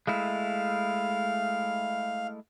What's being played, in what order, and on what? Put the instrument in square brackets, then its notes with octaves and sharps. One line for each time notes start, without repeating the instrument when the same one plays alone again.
[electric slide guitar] G#3 A3 E4 [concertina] F5